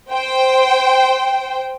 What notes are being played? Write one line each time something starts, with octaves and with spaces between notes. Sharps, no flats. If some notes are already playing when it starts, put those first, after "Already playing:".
C5 G5